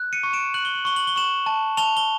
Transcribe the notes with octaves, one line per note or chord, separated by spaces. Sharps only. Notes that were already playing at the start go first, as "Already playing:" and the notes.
Already playing: F#6
C#7 D#7
C#6
D7 E7
F#6 F#7
G7
F#7
C#6 G7
F#7
G7
C#6 E7 F#7
A5
A5 F7 G7
G7